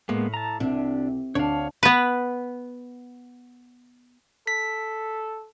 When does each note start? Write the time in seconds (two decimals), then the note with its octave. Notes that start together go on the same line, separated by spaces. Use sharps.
0.09 A2 G#3 A#3 B3
0.34 A5 A#5
0.60 C2 C3 D4
1.35 D2 D4 C#5 F5
1.83 B3 B4
4.47 A4 B6